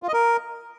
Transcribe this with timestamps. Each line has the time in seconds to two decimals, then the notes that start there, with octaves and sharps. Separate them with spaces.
0.03 F4
0.08 D#5
0.13 A#4